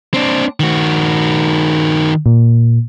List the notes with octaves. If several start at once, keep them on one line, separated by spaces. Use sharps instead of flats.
C4 D4
D#3 F#4
A#2